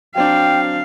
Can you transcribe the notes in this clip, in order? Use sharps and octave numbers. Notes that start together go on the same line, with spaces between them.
F#3 C4 D4 F5 G5